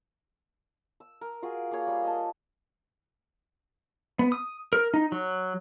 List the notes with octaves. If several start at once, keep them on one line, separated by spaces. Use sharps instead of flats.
E6
A#4
F4 F#4 G#4
A#3 G#4 C#5 G5
G3 G#4
D#5 A5
B3
D#6
A#4
D#4
F#3